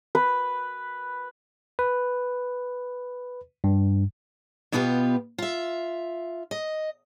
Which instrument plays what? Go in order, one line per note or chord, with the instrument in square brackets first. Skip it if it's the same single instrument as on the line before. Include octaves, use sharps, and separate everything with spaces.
[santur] B4
[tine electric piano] B4
G2
[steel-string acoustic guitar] B2 B3 E4 F4 G4 B4
F4 E5
D#5